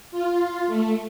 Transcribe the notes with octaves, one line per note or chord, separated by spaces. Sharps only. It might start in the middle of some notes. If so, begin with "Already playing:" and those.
F4
A3